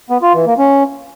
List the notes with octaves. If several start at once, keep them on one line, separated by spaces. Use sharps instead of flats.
B3
F4
E3
A#3
C#4